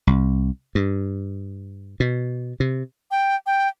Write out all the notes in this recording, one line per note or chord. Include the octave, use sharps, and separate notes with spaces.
C2
G2
B2
C3
G5
G5